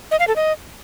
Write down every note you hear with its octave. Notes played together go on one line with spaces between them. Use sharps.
D#5
F5
A4
D#5